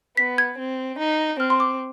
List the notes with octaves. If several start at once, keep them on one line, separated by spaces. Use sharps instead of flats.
B3 B6
G#6
C4
D#4
C4 F6
C6
D6